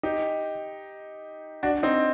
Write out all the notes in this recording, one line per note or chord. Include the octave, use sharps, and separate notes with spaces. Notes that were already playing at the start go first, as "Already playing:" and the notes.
D#4 G4
D4 F#4
C4 D#4